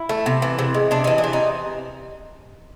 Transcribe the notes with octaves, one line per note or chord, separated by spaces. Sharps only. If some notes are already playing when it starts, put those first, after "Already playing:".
Already playing: E4
A3
C3
E3
C3
G#3
C3 D4
E3 D#4
D4
C3
D#4